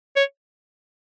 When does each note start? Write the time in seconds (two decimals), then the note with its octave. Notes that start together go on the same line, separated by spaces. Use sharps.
0.16 C#5